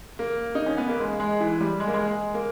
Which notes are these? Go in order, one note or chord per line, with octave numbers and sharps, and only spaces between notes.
A#3
D#4
C#4
B3
A#3
G#3
G#3
E3
G3
G#3
A#3
G#3
G#3
A#3